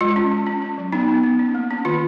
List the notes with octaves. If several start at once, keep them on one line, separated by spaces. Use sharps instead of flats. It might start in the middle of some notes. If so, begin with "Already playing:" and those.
G#3 F4
C#4
C#4
C#4
C#4
F#3
B3 D#4
B3
B3
C#4
A#3
C#4
D#3 F4